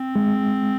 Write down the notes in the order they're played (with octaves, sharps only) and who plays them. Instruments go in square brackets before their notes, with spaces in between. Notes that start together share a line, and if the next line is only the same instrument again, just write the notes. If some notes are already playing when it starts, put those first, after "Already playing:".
Already playing: [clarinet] C4
[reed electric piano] G#3